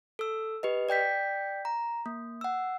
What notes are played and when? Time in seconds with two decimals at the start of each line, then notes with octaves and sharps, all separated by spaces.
0.19 A4 E6
0.63 G4 B4 D#5
0.89 D5 G5 G6 B6
1.65 A#5
2.06 A#3
2.41 F#5 E6